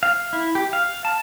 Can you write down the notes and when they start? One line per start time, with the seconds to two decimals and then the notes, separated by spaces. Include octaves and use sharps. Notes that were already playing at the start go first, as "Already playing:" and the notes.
0.03 F5
0.33 E4
0.55 G4
0.73 F5
1.05 A5